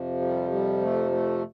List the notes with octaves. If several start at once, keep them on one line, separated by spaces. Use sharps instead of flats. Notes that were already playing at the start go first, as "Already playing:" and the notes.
Already playing: F2 C3 F3
G3
G3
A3
A3